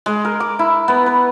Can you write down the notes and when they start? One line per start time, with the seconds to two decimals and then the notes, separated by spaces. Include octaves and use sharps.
0.06 G#3
0.25 A#4
0.40 D6
0.59 E4
0.88 B3
1.06 B4